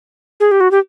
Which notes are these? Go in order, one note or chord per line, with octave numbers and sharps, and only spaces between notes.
G#4
G4
F#4
G4